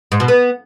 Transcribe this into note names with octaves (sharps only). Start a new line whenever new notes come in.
G#2
B2
B3